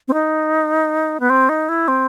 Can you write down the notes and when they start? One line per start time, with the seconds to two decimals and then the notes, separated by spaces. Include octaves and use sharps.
0.08 C4
0.13 D#4
1.20 B3
1.30 C4
1.49 D#4
1.69 E4
1.88 C4